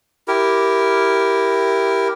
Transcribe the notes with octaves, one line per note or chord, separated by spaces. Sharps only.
E4 G4 A#4